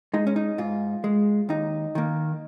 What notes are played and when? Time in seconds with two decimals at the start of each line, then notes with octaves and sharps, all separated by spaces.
0.14 G#3 D#4
0.27 C#4
0.36 D#4
0.58 G#2 F4
1.04 G#3
1.49 D#2 D#4
1.95 D#3 A#3